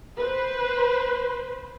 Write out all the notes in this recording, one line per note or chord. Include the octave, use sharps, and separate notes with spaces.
B4 C5